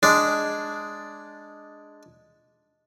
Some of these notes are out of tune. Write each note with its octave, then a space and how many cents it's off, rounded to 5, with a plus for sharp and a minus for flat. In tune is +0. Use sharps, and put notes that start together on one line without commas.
G#3 +0 D4 +0